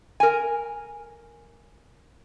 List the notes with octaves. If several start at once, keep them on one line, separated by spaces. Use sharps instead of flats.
A#4 G#5